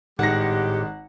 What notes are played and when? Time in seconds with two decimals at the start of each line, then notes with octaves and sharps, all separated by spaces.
0.19 G#1 A2 G3 G#3 G4 F#5 A#6